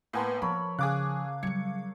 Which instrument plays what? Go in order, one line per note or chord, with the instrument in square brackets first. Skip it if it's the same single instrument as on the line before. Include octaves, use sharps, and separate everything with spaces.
[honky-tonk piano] A2 G#5 C6 [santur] A#3 B3 A5
[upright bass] F3 [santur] A4 A#4 C#5 [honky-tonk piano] B5
[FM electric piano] C#3 F5 [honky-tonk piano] G#4 D6 F#6
[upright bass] F#3 G3 [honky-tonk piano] G#6 C#7